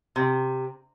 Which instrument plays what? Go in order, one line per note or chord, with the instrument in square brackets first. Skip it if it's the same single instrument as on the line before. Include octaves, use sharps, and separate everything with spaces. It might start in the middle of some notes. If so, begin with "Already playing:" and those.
[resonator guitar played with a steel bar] C3